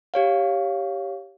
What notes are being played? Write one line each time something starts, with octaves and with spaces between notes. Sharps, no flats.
G4 C#5 F5